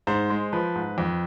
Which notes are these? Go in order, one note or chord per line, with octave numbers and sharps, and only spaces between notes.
G#2 C5
G#3
F3 B4
G#2
F2